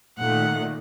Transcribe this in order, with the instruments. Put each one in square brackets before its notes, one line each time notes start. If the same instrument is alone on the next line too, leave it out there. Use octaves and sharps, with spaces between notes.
[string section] A#2 D#3 A3 [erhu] F#5